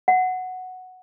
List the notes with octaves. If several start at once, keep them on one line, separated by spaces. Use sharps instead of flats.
F#5